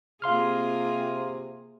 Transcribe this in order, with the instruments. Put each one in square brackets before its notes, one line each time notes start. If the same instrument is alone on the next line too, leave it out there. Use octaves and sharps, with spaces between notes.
[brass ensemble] C3 [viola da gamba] A#3 F4 G#4 [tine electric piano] F5 C6 F6